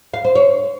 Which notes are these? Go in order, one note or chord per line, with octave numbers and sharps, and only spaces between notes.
F5
C5
C#5